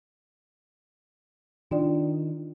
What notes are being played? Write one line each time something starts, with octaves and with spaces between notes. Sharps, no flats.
D#3 D4 F4 D5